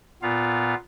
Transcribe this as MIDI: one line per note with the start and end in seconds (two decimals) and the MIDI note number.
0.22 0.75 46
0.22 0.75 59
0.22 0.75 65
0.22 0.75 77